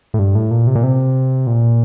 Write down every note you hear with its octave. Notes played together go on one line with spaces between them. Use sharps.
A2
G2
A2
A#2
C3
A#2
C3
A#2